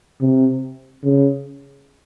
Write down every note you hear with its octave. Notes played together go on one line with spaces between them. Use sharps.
C3
C#3